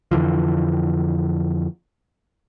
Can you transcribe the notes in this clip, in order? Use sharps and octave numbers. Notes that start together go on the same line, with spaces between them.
F2 D3 E3 F3